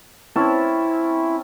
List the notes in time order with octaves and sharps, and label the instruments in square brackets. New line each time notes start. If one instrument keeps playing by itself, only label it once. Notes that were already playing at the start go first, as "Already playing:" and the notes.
[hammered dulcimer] C4 C#4 A5 [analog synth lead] E4